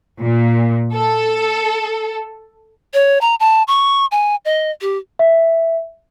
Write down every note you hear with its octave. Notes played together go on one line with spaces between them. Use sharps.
A#2
A4
C#5
A#5
A5
C#6
G#5
D#5
G4
E5